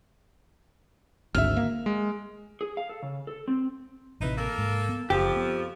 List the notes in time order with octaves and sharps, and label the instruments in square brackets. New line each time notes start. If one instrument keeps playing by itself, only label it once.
[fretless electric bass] G#1 D2 G#2 [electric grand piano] E5 F6
[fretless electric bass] A#3
[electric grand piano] G#3
[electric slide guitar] G#4
F5
A4
C#3
A4
C4
[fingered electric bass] A1 C3 [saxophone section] D#4 E4 B4
[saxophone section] A#3 A4 A#4
[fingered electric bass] G#2
B3
[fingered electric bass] F#1 [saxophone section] F2 F3 [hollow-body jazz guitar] G4
[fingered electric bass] B3